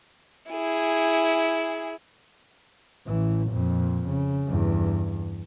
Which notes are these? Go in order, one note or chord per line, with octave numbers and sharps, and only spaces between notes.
E4 G#4
A1 E3
F2 A#2
C#3
E2 G2